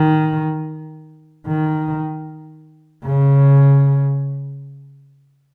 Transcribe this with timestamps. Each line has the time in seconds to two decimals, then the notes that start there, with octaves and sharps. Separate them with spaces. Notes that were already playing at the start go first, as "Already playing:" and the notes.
Already playing: D#3
1.47 D#3
3.04 C#3